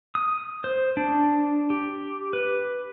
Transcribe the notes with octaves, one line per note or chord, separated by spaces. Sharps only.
D#6
C5
D4
G4
B4